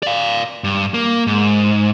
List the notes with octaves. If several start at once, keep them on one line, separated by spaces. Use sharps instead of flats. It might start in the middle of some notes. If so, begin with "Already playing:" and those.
D5 F5
G2
A#3
G#2